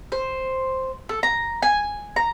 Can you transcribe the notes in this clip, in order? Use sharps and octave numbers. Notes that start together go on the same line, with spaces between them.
C5
A4
A#5
G#5
A#5